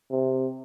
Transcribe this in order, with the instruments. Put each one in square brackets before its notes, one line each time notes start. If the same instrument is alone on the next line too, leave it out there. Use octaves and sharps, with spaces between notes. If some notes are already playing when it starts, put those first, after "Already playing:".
[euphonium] C3